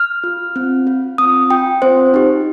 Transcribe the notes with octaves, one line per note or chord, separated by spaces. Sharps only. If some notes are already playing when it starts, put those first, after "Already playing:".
Already playing: F6
F4
C4
F4
C4 D#6
F4 G5
C4 C5
D#4 G4